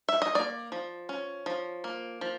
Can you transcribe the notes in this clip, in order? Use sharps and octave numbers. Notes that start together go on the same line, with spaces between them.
E5
D#5
A#3 D5
F3
C#4
F3
A#3
F3